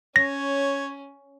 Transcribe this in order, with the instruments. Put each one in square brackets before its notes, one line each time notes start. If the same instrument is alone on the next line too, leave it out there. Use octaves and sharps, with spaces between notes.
[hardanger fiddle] C#4 [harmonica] C#5 [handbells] A#6